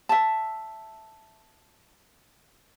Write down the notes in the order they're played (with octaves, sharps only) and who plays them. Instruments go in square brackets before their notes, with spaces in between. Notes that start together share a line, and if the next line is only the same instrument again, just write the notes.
[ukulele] E5 A5